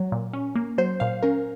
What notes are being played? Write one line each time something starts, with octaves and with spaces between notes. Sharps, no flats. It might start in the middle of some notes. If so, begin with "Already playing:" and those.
Already playing: F#3
A#2
C#4
A#3
F#3 C5
A#2 F5
C#4 A#4